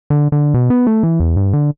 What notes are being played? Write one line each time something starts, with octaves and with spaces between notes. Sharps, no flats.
D3
D3
B2
B3
A3
E3
E2
G2
D3